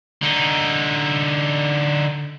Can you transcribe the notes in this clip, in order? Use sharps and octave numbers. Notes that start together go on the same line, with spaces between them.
D3 D#4